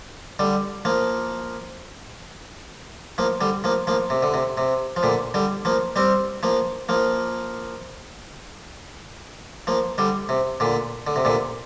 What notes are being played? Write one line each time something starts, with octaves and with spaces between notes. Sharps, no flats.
D3 G3
F3 A#3
F3 A#3
D3 G3
F3 A#3
F3 A#3
C3
D3
C3
C3
F3
A#2 D3
D3 G3
F3 A#3
G3 C4
F3 A#3
F3 A#3
F3 A#3
D3 G3
C3
A#2 D3
D3
C3
A#2 D3